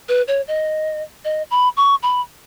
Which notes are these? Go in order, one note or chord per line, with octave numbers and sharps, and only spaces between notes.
B4
C#5
D#5
D#5
B5
C#6
B5